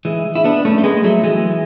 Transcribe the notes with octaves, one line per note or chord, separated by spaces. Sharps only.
E3 G#3
E4
B3 D4
A3 C#4
A3
G#3 B3
F#3 A3
E3 G#3